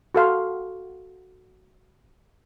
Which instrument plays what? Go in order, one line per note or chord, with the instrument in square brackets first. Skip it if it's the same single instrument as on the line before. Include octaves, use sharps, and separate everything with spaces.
[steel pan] F#4 A4 F5 C6